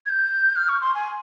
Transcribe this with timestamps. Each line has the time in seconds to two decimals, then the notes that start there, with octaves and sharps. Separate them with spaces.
0.06 G#6
0.09 G6
0.56 F6
0.69 C#6
0.81 C6
0.95 G#5